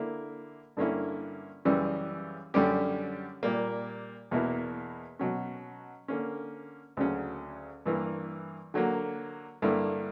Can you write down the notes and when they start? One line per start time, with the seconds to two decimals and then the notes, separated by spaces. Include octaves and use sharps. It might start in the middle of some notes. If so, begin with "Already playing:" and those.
Already playing: D3 A#3 E4
0.77 G2 D3 A#3 C#4 E4
1.65 F#2 C#3 E3 G3 C#4
2.54 F#2 D3 G3 C#4 G4
3.43 A#2 G3 A#3
4.31 E2 B2 A#3 E4
5.19 B2 F#3 C#4
6.08 D3 A#3 C#4
6.97 D2 C#3 F#3 C#4
7.86 G2 E3 A#3
8.74 D3 F#3 A#3
9.62 G2 D3 A#3 E4